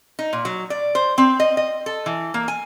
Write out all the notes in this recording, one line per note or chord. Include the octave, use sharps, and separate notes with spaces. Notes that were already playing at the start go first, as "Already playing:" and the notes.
D#4
A#2
F#3
D5
C5
C4
D#5
D#5
A4
E3
A#3
G#5